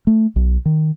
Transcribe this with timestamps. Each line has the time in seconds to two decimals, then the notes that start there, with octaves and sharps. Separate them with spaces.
0.07 A3
0.36 B1
0.65 D#3